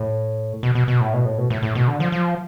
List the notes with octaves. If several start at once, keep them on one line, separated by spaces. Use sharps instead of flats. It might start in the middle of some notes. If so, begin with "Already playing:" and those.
Already playing: A2
B2
B2
B2
A2
B2
A2
B2
A2
A2
B2
D3
F3
F3